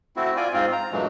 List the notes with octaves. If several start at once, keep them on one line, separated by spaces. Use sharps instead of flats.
A3 C4 E4 F#4
F4 D5 G#5
G#2 C4 F4
A#5
G2 A#2 E3 F#3 G#3 A3